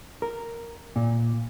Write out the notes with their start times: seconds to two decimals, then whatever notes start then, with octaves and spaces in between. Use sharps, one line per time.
0.22 A#4
0.96 A#2